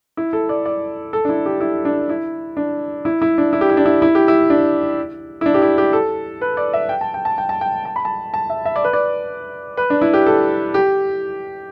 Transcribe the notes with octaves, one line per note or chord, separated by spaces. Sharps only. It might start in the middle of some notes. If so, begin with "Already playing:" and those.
E4
A4
D5
D5
A4
D4
E4
G4
E4
D4
E4
D4
E4
E4
D4
E4
G4
E4
D4
E4
E4
G4
E4
D4
E4
D4
G4
E4
G4
A4
B4
D5
E5
G5
A5
G5
A5
G5
A5
G5
A5
B5
A5
A5
E5
E5
D5
B4
D5
B4
D4
E4
G4
A4
G4